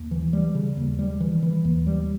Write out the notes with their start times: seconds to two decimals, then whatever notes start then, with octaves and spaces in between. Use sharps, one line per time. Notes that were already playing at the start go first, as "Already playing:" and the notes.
Already playing: D#2
0.11 E3
0.33 G3
0.55 C#3
0.77 D#2
0.99 G3
1.20 E3
1.43 E3
1.65 D#2
1.87 G3